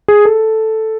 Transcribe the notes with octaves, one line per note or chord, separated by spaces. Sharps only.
G#4
A4